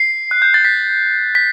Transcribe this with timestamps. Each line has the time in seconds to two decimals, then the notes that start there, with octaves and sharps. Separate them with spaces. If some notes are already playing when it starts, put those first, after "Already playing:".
Already playing: C7
0.31 F#6
0.42 G6
0.54 A6
0.65 B6
1.35 B6